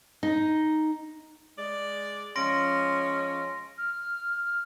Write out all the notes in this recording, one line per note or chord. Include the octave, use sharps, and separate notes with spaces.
D#4
G#3 D5
F3 G#3 C#4 C6 A#6 D7
F6